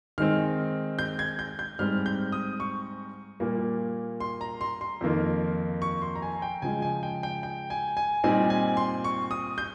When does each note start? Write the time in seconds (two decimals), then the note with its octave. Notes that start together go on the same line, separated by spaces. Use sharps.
0.18 D#3 G#3 C4 F6
0.99 G6
1.19 G#6
1.39 G6
1.59 G6
1.79 G#2 G3 C4 F6
2.06 G6
2.32 D#6
2.60 C#6
3.40 A#2 G3 A#3
4.20 C6
4.41 A#5
4.61 C6
4.81 C6
5.01 F2 D#3 A#3 F4
5.82 C#6
6.02 C6
6.15 A#5
6.22 G#5
6.42 G5
6.62 C#3 F3 G#3 G#5
6.82 G#5
7.03 G5
7.23 G5
7.43 G5
7.70 G#5
7.97 G#5
8.24 A#2 G3 C4 D#4 G#5
8.50 G#5
8.77 C6
9.04 C#6
9.31 D#6
9.58 G6